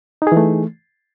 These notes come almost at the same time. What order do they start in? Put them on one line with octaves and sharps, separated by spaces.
D#4 G#4 E3 A3